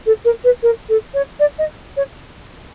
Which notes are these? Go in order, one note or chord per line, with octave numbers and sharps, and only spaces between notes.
A4
A#4
B4
A#4
A4
C#5
D5
D#5
C#5